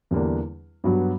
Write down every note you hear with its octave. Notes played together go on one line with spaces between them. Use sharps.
E2 D3 G3 A#3 D4
G2 F#3 B3 F#4